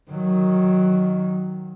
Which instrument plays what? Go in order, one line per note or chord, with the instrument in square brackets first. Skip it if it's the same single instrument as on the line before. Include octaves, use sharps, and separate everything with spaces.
[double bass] D#3 F#3